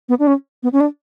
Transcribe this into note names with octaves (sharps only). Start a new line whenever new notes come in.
B3
D4
C#4
B3
C#4
D4